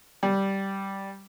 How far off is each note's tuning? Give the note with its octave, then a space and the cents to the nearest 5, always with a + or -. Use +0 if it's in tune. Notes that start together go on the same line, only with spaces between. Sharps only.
G3 -5